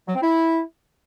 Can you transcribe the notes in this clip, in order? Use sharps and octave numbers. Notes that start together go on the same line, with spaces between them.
F#3
C4
E4